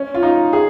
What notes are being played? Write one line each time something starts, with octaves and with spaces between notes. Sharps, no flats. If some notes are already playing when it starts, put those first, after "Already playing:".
Already playing: C#4
F4
D#4
G#4